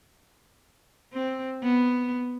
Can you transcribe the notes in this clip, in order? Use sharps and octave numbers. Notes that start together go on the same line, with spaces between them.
C4
B3